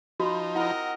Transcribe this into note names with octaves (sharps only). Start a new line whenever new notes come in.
F3 D#4 F#4 B5 C6
C4 E4 F4 A#4 D#5 F#5